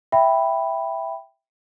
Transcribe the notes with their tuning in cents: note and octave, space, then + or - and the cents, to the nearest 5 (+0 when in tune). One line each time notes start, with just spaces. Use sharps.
E5 +0 G5 +0 B5 +0